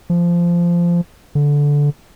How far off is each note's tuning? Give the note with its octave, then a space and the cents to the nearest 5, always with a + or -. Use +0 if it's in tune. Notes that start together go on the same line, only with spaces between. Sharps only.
F3 -15
D3 -15